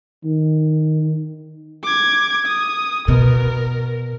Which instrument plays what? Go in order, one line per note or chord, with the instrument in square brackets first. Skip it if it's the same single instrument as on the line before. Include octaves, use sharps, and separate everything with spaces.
[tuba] D#3
[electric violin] D6 G#6
D#6
[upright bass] B2 [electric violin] A#4